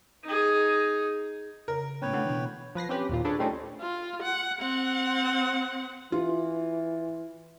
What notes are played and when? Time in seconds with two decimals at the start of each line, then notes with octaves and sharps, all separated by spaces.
0.24 D#4 G#4
1.68 C#3 A#4
2.02 A2 B3 C#4 B4 C#5 G5
2.13 D3 A3 F#5
2.25 B2 E3
2.75 F3 B4 A#6 C7
2.89 C4 C#4 G4 B4
3.09 D#2 A#2 F4
3.25 D4 G#4 A4 B4 C#5
3.39 G3 A3 C4 C#4 D#4
3.81 F4
4.23 F#5
4.60 C4 F#5
6.12 E3 F4